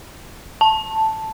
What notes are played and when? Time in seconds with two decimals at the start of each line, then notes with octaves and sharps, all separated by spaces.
0.61 A5